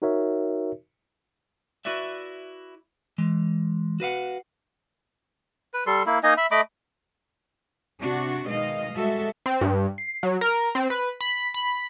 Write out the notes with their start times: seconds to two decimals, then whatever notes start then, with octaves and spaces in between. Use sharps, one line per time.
0.02 D#4 F#4 A#4 C#5 E5
1.85 E4 F#4 B4 D5 E5
3.18 E3 G#3
4.00 F#4 B4 F5 F#5
5.74 B4
5.86 G3 A4 C6
6.06 A#3 E4
6.23 A#3 D#4 D#5 G#5
6.37 E5 B5
6.51 A3 D#5 B5 D6
8.00 C3 D4 F#4
8.48 B2 D#3 G#3 D#5 F5
8.94 G3 G#3 F#4 A4 E5
9.46 C4
9.61 G2
9.98 C7
10.23 F#3
10.41 A#4
10.75 C4
10.90 B4
11.21 B5
11.54 B5